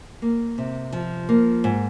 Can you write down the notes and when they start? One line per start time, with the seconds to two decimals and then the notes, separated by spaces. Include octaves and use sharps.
0.22 A#3
0.58 C3
0.93 F3
1.29 A#3
1.64 G#2